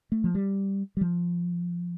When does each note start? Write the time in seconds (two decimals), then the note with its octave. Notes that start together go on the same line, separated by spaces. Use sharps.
0.12 A3
0.24 F3
0.35 G3
0.97 G3
1.01 F3